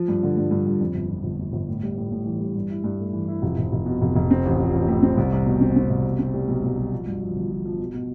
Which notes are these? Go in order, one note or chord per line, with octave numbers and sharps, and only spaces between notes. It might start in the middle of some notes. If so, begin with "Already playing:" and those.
Already playing: F3
G2
D3
G2
G2
G2
F2
G1
F2
G1
G1
G1
A2
G3
A2
A2
E3
G3
G2
E4
G2
A3
E3
E4
F1
F1
F1
B2
F1
F1
C4
A1
F3
A1
A2
C4
C2
C2
B2
C4
C4
C2
B2
C4
G3
B1
B1
G3
F3
G2
F3
G1
F3
F3
B2
B2